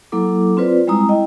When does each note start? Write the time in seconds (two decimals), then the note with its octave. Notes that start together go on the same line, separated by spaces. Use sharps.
0.12 F#3 A#3 E4 A4 D6
0.57 C4 F4 B4 C5 D5
0.87 G3 G#3 C4 E4 A#5 D#6
1.09 E4 D#5 G5